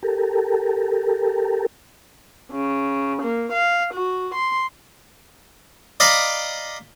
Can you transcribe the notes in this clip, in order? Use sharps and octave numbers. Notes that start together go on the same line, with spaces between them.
G4 A4 A#4
C#3
A#3
F5
F#4
C6
D5 D#5 F5 A#5 B5 D6